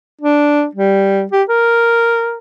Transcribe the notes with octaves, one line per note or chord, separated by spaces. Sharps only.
D4
G3
G4
A#4